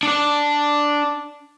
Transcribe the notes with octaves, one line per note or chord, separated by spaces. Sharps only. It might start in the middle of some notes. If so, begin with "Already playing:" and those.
D4 D5